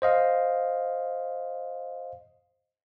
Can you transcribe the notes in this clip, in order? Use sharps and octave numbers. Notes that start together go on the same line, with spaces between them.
C5 D#5 F5